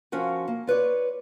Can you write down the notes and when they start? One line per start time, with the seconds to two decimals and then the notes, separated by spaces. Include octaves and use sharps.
0.12 F3 C#4 F4 F#4 A#4
0.48 A#3
0.67 F4 B4 C#5 D5